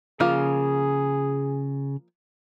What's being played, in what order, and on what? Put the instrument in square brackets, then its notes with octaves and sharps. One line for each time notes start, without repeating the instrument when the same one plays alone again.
[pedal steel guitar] C#3 F6 [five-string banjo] F3 A#3 F4 [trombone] G#4